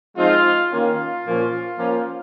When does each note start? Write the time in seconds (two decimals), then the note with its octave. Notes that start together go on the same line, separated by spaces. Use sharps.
0.17 F3 G#3 C4 D#4 F4
0.70 D#3 A#3 C#4 F4
1.25 A#2 F3 A#3 C#4
1.78 F3 A#3 C#4